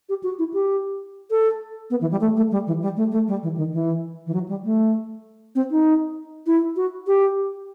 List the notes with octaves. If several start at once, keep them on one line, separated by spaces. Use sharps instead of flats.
G4
F#4
E4
G4
A4
B3
E3
G3
A3
A3
G3
E3
G3
A3
A3
G3
E3
D#3
E3
E3
F#3
G3
A3
C4
D#4
E4
F#4
G4